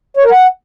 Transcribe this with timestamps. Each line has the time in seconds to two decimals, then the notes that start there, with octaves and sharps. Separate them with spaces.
0.17 C#5
0.24 A#4
0.31 F#5